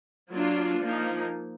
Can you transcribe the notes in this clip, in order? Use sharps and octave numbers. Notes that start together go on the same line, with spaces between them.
F#3 A#3 D4 F4
F3 A#3 D#4